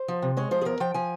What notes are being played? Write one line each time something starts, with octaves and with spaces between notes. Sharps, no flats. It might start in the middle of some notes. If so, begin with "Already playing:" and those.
Already playing: C5
F3
C3
G#3 C#5
F3 C5
G#4
E2 A#4
F3 G5
F3 G#5